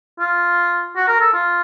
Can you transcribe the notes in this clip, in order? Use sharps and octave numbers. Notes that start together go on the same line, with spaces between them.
F4
F#4
A#4
A4
F4